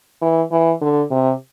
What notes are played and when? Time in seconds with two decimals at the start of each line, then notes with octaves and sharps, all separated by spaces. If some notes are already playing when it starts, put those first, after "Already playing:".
0.21 E3
0.51 E3
0.81 D3
1.11 C3